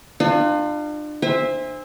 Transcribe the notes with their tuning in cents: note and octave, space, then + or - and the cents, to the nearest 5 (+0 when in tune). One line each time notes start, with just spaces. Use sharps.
D4 +40 F4 +0 G#5 +10
C5 +0 E5 -10 G#5 -35